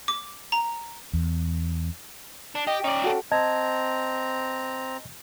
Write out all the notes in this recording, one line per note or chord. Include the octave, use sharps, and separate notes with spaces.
D6
A#5
E2
D4
G4 D#5 G5
C#4 D#4 D5
F#4 A4
C4 D#5 A5 A#5 G#6